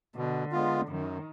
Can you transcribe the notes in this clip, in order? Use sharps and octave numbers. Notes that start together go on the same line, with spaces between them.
B2 D3
G#3 B3 F4
F#2 D#3